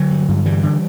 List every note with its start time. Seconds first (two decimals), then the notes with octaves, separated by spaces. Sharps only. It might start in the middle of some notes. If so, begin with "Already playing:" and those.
Already playing: D3 F#3
0.11 G2
0.28 G2
0.45 D3 E3 G3
0.63 D3